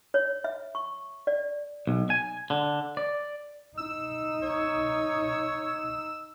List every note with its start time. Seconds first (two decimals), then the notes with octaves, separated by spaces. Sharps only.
0.14 C#5
0.44 E5
0.75 C#6
1.27 D5
1.87 B1
2.10 G#5
2.50 D3
2.97 D5
3.78 D#4 E6
4.43 C#5